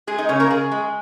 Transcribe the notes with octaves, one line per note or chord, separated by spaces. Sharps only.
G#3 G#4 G#5
D#4 D#5
C#3 C#4 C#5
A#3 A#4
C#3 G#4
G#3